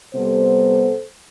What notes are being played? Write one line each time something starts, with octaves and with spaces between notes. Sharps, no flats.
C3 G3 B3 A4 C5